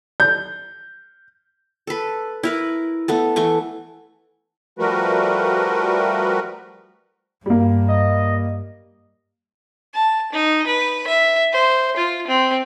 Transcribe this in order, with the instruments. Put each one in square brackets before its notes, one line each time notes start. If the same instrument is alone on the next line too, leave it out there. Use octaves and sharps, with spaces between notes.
[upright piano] G6
[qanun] A4 B4
E4 A#4 B4
A3 B3 A4
E3 A3 C#6
[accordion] F3 G3 A3 F#4 A#4 B4
[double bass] G2 [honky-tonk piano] G3 A#3
[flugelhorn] D#5
[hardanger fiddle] A5
D#4
B4
E5
C5
F4
C4